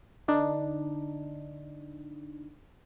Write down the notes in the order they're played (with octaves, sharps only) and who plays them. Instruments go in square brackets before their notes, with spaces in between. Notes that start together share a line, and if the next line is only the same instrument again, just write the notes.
[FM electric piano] D3 D4 D#4